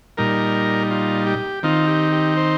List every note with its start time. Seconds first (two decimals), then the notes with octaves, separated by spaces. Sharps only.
0.17 A#2 G3 D#4 A#4
0.91 F4
1.27 G4
1.63 D#3 C4 D#4 F4
1.87 G4
2.12 G4
2.37 C5